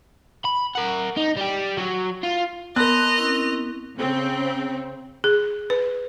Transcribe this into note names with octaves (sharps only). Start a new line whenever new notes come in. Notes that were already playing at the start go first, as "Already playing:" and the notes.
B5
A#4 F#5
D#4
G3 G4
F#3 F#4
F4
B3 A#4 D#5 A5 B5 C6 F#6 F7
C4 C#4 E4
C#3 C4
G#4
B4